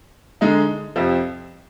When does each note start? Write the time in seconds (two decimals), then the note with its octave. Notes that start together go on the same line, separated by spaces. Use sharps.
0.41 D3 G#3 D#4
0.96 F2 C3 F3